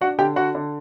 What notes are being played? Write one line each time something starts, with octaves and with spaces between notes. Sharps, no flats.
D4 F#4 F#5
D3 G4 G5
D3 F#4 F#5
D3